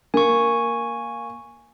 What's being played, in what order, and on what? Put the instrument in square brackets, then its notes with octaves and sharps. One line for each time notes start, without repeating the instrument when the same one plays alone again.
[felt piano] A#3 [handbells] G#5 C#6